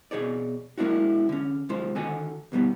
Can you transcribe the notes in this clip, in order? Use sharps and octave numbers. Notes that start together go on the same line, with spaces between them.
B2 G#4 C#5 D5
G#3 A#3 D4 E4 F#4
D3 C#4
D#2 C3 G#3 F4 C5
D3 D#3 F#4 A4 F#5 G#5
D2 B2 G3 B3